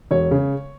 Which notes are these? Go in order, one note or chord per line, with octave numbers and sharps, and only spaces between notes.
E1 C#5
C#3